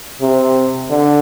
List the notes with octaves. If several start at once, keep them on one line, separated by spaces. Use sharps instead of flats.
C3
D3